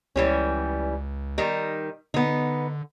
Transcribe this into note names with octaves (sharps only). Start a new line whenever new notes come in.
C#2 E3 G3 C#4
D#3 G3 D#4
D3 B3 D#4